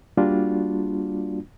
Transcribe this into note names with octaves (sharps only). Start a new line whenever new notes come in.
G3 A#3 D4 F4 F#4